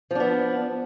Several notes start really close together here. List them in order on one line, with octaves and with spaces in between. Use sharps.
F3 D4 B3